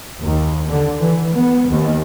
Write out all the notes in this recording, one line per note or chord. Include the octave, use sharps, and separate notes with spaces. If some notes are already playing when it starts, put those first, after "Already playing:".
D#2
D3
E3
B3
D#2